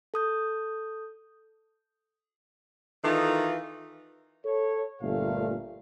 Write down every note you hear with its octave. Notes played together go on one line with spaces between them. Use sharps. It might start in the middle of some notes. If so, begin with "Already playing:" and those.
A4 D#6 G6
D#3 E3 D#4 F4 A4
A4 C#5
G1 A#2 A3 F5